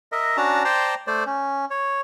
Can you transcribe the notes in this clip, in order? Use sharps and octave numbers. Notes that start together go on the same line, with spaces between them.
A#4 D#5 E5
C#4 D4 F#4 A5 A#5
C5 D5 G5 A5 A#5 C6
A3 C5 D5
C#4
C#5